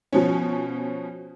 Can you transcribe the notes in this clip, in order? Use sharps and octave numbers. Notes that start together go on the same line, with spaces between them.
B2 F3 C#4